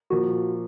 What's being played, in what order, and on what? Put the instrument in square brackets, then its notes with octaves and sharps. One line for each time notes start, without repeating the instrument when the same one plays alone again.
[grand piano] A#2 F3 A#3 [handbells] F#4